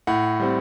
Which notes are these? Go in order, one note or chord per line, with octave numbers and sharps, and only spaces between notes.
A2 F#5
G3 C4